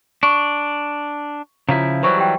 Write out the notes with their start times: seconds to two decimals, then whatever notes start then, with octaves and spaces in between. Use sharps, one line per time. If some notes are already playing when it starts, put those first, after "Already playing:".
0.23 D4 C#6
1.69 C#3 F3 E4 F4 F5 A#5
2.03 E3 F#3 G3 C5 B5 C#6
2.17 G4 G5